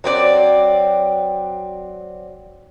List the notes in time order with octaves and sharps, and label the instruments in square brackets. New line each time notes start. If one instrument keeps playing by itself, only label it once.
[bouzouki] F#3 C4 D#4 D5